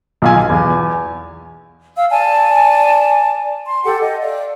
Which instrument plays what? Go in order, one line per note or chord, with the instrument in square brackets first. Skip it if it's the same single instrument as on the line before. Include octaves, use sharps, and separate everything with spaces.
[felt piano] B1 F4 G#5
E2
[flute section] F5 E6
D5 G#5 A5
C6
G4 A4 F#5
D#5
D5 F5